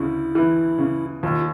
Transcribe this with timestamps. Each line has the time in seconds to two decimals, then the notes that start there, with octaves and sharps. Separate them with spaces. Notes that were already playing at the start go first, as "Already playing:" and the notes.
Already playing: D2 C#3 E4
0.35 E3
0.78 C#3
1.23 D#2 F4